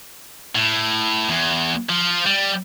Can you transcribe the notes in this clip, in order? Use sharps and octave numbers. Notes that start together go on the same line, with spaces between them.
A2
E2
F3
G3